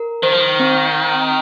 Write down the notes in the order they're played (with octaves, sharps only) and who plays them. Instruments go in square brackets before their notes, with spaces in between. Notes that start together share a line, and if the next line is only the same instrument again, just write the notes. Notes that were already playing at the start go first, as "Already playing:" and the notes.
Already playing: [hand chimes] A#4
[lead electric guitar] D#3 [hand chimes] C5
[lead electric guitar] F3
D#3
[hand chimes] C4